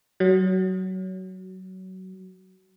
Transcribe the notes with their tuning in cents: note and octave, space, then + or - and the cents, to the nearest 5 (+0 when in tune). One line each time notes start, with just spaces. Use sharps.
F#3 +20